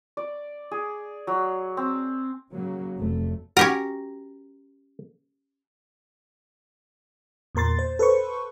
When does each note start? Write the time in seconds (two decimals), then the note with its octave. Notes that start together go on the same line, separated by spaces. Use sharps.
0.17 D5
0.71 G#4
1.27 F#3
1.77 C4
2.52 C#3 F#3 A#3
2.98 F1 C3 A3
3.57 C#4 F#4 G4 A#4
7.55 E2 A#2 A#4 C6 A6
7.79 C5
7.99 A4 B4 C5 C#6